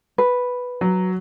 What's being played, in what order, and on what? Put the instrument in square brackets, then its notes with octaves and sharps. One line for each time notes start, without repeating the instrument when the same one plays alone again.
[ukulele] B4
[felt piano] F#3